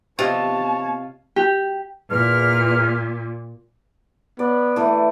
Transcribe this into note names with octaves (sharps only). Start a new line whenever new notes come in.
C3 B3 F4 C#5 D#5 A5
G4
E2 A#2 F6
B3 D5
E3 A3